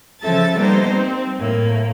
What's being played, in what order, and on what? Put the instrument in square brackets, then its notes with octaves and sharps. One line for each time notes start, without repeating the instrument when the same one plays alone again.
[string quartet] C#3 F3 A4 E5 A5 A6
G3 A#3 B3 D#4 C5
C4
A2 A#3